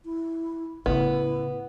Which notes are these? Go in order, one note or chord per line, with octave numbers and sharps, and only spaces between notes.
E4
A2 C#3 B3 E4